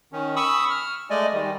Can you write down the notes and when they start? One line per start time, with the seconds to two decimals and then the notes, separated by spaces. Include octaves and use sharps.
0.12 D#3 C#4
0.36 B5 C#6 D#6 E6
0.70 F6
1.10 G#3 A3 D5 D#5 G#5
1.33 D#3 G3